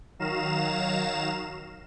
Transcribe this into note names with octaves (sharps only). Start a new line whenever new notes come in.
D#3 F#3 F5 A#5 E7